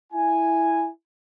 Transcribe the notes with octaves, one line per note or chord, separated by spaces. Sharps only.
E4 G#5